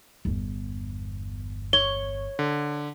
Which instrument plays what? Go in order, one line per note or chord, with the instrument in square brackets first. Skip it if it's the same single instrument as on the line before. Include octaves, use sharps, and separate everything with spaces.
[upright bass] G1 E2
[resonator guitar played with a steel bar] C#5 [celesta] G7
[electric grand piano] D3